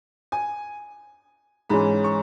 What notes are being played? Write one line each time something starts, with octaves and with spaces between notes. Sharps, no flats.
G#5
G#2 E3 G#3 C#4 B5
C#6